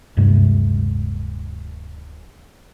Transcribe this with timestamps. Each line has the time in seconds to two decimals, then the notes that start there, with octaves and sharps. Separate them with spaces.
0.17 D1 G2 C3 G#3